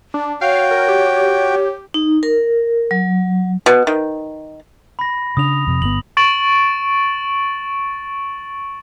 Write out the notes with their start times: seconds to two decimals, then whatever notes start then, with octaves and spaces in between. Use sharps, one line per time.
0.14 D4
0.41 F#4 C#5 F5 G5
0.71 A#4
0.89 G4
1.94 D#4
2.23 A#4
2.91 F#3
3.66 B2
3.87 D#3
4.99 B5 A#6
5.37 C#3 C#4 D4 D#6 F7
5.67 F2 C3
5.82 G1 B3 F#7
6.17 C#6 A6 D7 E7 F#7